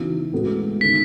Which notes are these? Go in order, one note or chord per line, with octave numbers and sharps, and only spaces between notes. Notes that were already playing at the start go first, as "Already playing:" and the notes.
Already playing: C#3 E3 B3 D#4 F#4
A2 G#3 B3 F#4 A4
D#3 A3 C#4 B6